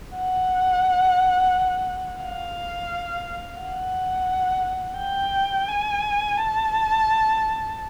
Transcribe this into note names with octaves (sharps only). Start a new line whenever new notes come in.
F#5
F5
F#5
G5
G#5
A5